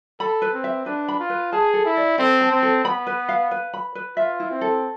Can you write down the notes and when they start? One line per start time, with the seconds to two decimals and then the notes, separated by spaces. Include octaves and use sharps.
0.20 A4 B5
0.42 B4
0.53 C4
0.64 E5
0.86 D4 B4
1.09 B5
1.19 F4
1.30 B4
1.52 G#4 A5
1.74 A4
1.85 E4
1.97 D5
2.18 C4 A4
2.41 A5
2.52 C4
2.63 A4
2.85 B3 B5
3.07 B4
3.29 F5
3.51 B4
3.74 B5
3.95 B4
4.17 F4 E5
4.40 E4
4.50 C4
4.61 A4